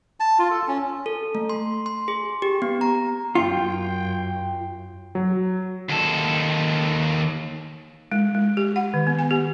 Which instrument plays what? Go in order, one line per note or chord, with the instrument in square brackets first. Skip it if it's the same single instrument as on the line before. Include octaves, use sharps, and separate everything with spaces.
[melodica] A5
F4
A4
C#4
[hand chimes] A4
A3
C6
C6
G#4
G4
B3
A#5
[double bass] F#2 [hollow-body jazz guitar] F4 [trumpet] G5
[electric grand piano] F#3
[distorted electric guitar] D#2 A4
[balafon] G#3
G#3
G4
F#5
D#3
B3
G#5
G4